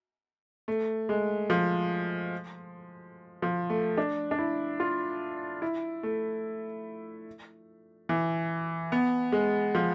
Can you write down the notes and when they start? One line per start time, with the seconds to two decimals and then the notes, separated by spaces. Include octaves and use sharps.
0.68 A3
1.09 G#3
1.50 F3
3.42 F3
3.70 A3
3.98 D4
4.31 D4
4.38 E4
4.80 F4
5.62 E4
6.03 A3
8.09 E3
8.92 B3
9.32 G#3
9.75 F3